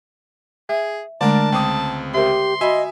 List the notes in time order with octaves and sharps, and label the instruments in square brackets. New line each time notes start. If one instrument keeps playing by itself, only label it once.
[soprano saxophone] G#4 [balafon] E5
[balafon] D3 G#3 A3 [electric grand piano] D4 A#4 D5 [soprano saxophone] A5
[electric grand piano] C#2 C4 D#6 [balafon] G5 D6
[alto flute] G4 [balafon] A#4 C5 E5 [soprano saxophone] C6
[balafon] F#4 B5 [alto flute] D#5 [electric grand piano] E5 G#5